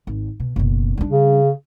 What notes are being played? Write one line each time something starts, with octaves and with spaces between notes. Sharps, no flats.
G#1
B2
F#1 B2
G3 D4
C#3